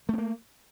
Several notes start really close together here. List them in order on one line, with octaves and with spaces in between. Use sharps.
A3 C4 A#3